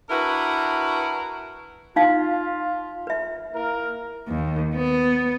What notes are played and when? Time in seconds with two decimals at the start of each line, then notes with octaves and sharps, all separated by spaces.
0.10 D4 E4 F#4 A#4 B4
1.96 D#4 F4 F5
3.07 B4 E5
3.52 A#3 E4 A#4
4.28 D#2
4.75 B3